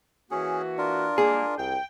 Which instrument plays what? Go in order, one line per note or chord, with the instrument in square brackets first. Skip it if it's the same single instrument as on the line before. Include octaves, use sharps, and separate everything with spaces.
[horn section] E3 A#3 F#4 [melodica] C#4 G#4
[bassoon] D4 [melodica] F4 A#4
[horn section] G3 G#3 A#3 [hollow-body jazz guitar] G#4
[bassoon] C2 [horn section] G5